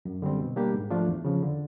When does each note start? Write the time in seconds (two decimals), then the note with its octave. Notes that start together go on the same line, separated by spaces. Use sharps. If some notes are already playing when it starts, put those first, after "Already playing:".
0.05 F#2
0.22 D3 G3 C4
0.40 B2
0.56 G3 A#3 D4 G4
0.74 G#2
0.90 F3 A3 D4 F4
1.08 E2
1.25 C#3 F3
1.43 D3